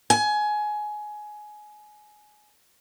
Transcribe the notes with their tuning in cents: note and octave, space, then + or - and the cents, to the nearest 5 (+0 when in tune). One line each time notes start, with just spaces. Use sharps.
G#5 +20